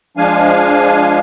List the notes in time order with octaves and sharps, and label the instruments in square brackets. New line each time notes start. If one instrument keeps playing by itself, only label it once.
[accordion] F3 G#3 D4 F5 G#5